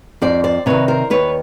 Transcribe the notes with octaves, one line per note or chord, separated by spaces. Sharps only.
F2 C5 D5
C5 D5
C3 D#3 B4 C#5
A#4 C5
D#2 B4 C#5